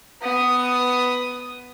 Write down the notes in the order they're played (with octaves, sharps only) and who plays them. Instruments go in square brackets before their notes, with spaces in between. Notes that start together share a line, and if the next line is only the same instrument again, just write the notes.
[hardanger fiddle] B3 D#6